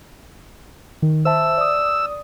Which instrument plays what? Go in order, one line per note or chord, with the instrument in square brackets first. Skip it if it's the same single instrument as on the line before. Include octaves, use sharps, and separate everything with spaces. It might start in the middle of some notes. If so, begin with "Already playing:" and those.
[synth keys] D#3
[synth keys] C5 E5 A5 [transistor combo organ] E6
[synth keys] D5 D#6